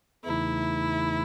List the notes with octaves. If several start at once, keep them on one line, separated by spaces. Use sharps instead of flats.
E2 C#3 E3 A3 D#4 E4